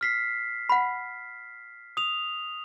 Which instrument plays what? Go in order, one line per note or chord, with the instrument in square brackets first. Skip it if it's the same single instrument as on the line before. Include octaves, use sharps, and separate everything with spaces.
[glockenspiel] F6 B6 C7
[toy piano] F#5 B5
[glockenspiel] D#6 F7